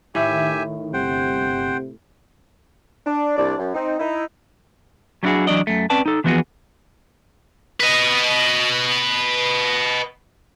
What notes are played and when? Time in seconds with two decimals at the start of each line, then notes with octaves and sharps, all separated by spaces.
0.15 A2 D#3 G4 E5 G#5
0.94 G1 C3 C5 F#5 G5
3.06 D4
3.37 C2 D4 D5
3.58 F#2
3.74 C4 D#4
3.99 D#4 E4
5.23 F#3 G3 D4 E4 F#4 G#4
5.47 E3 F#3 D4 D5 D#5
5.67 F#2 A3
5.90 C4 C#4 B4 D5 A5
6.06 D#4 A4
6.24 E3 F3 B3 D#4 F#4 G#4
7.80 B4 D#5